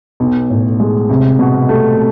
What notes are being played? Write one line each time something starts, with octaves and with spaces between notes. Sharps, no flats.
B1
A2
G#3
C2
B2
A3